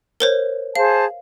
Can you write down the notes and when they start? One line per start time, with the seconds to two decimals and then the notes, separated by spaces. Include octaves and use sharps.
0.20 A#4 C5 C#5
0.75 G#4 C5 F5 A5